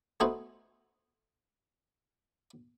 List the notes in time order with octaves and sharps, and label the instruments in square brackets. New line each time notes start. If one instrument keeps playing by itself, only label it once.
[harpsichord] A3 B3 D#4 F#4 C5 G#5